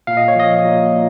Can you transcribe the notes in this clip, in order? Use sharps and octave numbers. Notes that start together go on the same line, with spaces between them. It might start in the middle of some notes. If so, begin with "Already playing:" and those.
A#2 F5
D#5
C#5
F3 D#5
A#2
A#2